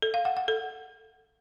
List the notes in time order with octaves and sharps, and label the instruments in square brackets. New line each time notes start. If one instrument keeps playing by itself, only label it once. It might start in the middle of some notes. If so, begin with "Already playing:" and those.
[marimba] A4
F5
F#5
F#5
A4